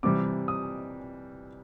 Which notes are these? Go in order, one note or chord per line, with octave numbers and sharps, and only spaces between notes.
C3 E3 G3 D6
D#6